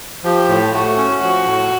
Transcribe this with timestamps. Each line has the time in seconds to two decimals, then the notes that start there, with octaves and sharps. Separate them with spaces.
0.24 F3 G4
0.49 A2
0.73 A3 F#4
0.97 C#4
1.21 F3 F#4
1.46 A2